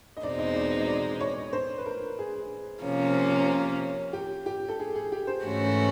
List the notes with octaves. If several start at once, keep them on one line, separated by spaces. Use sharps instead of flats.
D#5
E2 B2 G#3 C4 D#4 D5
D#5
D5
D#5
D5
C#5
C5
B4
A#4
G#4
C3 F3 A#3 C#4
G4
G4
A4
G#4
G#4
G4
C5
G#2 E3 A3 C#4 F#4